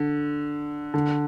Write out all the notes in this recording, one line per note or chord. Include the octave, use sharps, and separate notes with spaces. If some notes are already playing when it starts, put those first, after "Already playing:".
Already playing: D3
D3